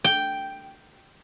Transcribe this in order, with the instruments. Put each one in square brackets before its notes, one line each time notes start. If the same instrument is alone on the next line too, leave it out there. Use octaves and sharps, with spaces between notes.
[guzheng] G5